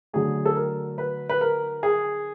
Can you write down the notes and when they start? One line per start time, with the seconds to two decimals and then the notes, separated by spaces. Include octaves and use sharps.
0.13 D3 F#3 A3 G#4
0.45 A4
0.56 A#4
0.98 B4
1.29 B4
1.41 A#4
1.83 G#4